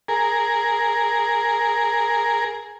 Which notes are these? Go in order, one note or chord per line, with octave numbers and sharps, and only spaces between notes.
G#4 A#4